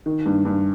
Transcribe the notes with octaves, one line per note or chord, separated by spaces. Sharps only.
D#3
G2
G2